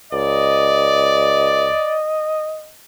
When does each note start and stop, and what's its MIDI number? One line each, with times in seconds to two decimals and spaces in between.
0.13 1.78 37
0.13 1.98 74
0.13 2.72 75